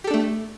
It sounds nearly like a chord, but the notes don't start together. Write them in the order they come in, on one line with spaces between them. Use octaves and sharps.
G4 A4 D4 A3